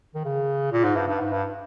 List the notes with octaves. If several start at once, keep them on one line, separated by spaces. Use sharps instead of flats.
D#3
C#3
A#2
G#2
G2
G2
G#2
G2